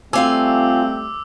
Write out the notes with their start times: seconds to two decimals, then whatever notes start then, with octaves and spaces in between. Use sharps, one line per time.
0.13 G3 A3 C4 F4 F5 G#5 D6 E6